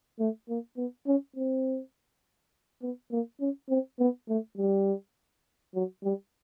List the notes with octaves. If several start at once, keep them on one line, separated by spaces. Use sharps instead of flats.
A3
A#3
B3
C#4
C4
B3
A#3
C#4
C4
B3
A3
G3
F#3
G3